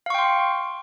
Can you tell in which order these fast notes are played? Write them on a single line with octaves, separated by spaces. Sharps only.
F5 C#6 G5 C6